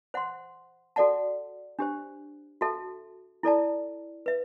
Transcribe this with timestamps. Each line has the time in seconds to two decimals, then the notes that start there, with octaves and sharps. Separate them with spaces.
0.14 C5 F#5 C6
0.96 F#4 A4 D5 F#5 A5
1.79 D4 G4 C5
2.61 F#4 A4 E5 A5
3.43 E4 A4 D5 A5
4.26 B4 E5